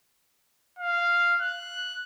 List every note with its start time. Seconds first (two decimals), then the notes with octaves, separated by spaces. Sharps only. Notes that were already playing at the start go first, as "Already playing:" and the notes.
0.79 F5
1.41 F#6